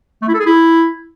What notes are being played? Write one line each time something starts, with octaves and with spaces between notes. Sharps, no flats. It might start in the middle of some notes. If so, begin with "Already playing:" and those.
A3
E4
A4
G#4
E4